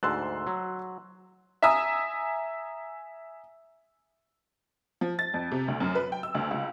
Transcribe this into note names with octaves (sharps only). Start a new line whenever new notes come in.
D2 G#2 A5 C6 E6 F#6
F#3
E5 G#5 A#5 D#6 E6
F3
A6
F2
C3
D2
F#2
B4
G5
E6
D2
C#2